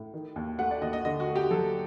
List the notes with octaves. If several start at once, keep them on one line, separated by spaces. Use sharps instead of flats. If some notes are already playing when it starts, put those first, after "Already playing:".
Already playing: A2
D#3
D#2
A3 F#5
D5
D#2 D#5
D#5
D3 D#5
F#4
A3
G4
F#3 A4